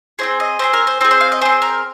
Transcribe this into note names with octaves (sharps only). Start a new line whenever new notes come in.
C4 D#4 G#4 C5
D#5
C4 D#4 G#4 C5
A#4
C5
C4 G#4 C5
C5
F5
D#5
C4 G#4 C5
A#4